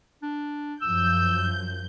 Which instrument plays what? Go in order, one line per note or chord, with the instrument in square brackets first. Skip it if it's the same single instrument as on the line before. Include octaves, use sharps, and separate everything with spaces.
[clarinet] D4
[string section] F#2 F3 G6 [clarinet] E6